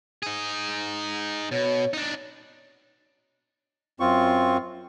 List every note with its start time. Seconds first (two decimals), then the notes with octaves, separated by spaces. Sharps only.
0.23 D#4 G#4
1.52 B2 C#5
1.93 D4 D#4
4.00 F#2 C4 F4 C#6